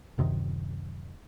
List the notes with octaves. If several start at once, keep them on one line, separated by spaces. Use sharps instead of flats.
D1 F#2 C3 D#3